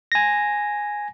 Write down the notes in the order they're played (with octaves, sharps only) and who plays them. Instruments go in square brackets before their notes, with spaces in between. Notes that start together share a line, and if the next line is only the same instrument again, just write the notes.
[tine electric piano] G#5 A#6